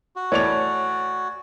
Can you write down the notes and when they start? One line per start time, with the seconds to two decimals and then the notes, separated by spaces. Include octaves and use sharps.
0.16 F#4
0.32 A2 E3 B4 C#5 D5 F7